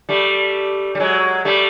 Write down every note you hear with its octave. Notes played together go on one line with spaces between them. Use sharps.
G3 A3
G3
F#3 G#3
G3 A3